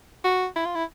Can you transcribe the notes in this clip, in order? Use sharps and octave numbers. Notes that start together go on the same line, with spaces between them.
F#4
E4
F4
E4